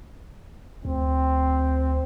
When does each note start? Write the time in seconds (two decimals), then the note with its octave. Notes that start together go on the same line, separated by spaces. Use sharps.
0.85 D2 C4